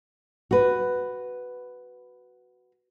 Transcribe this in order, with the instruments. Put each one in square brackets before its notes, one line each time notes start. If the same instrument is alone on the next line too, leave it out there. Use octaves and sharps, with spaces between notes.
[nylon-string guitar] F#4 B4